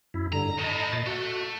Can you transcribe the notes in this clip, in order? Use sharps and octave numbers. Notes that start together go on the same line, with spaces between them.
F#2 E4
G2 D3 A#5
A2 D#5 A5 A#5
A#2 D#5 A6
A3 F#4